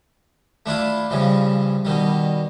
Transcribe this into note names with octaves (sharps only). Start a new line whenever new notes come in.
A3 D4 E4 F4
G2 C#3 E3 F3
B2 D#3 G3